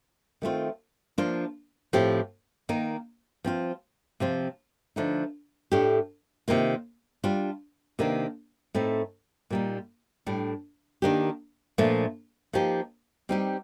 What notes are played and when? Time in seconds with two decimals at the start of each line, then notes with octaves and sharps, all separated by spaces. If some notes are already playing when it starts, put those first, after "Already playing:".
0.42 D#3 A3 C4 F4
1.18 F3 A#3 D4 F4
1.93 A2 F3 C4 G4
2.69 D#3 A#3 D#4
3.44 F3 C4 F4
4.20 C3 F3 C4 F4
4.96 D3 F3 A3 D#4
5.72 A2 A3 D4 G4
6.48 C3 D#3 A#3 F4
7.24 G3 D4 F4
7.99 C3 D#3 A#3 D4
8.74 A2 A3 C4 D#4
9.50 A#2 G3 A#3 D#4
10.26 A2 G3 D4
11.02 D#3 A#3 D4 G4
11.78 A#2 F3 A3 D4
12.53 F3 A#3 D#4 G4
13.29 G3 C4 D#4 G4